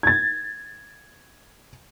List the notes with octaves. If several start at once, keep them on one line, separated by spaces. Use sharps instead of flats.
G#6 A6